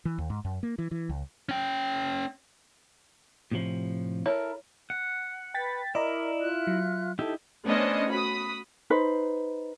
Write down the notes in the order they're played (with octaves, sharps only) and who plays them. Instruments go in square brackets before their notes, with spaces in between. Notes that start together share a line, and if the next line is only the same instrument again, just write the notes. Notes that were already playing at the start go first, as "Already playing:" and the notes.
[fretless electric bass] E3
D#2
G#2
F#2
A#3
E3
E3
C#2
[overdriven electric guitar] C#4 G5
[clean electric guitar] A2 C3 F3
[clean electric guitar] E4 A4 A#4 [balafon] C#5
[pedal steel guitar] F#5
[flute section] B4 [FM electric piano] G5 A6 B6
[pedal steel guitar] E4 [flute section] A#4 [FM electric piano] D5 D#5 A#5
[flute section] F4 E5 F#6
[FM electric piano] F#3
[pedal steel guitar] D#4 E4 G4 [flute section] A4 [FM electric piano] E6
[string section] A3 B3 C#4 D4 C5 D#5
F#4 B5 D#6
[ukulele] D#4 B4 C5